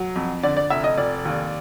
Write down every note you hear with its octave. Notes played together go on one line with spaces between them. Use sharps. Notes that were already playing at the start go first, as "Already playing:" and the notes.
Already playing: F#3
F2
D3 D5
D5
F1 E5
D#5
F1 D5
D#2